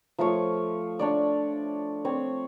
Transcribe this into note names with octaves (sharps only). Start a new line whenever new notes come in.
F3 A3 F4 C#5
D4 C#5 D5
C4 C#5